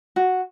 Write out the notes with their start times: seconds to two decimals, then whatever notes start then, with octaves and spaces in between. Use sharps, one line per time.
0.16 F#4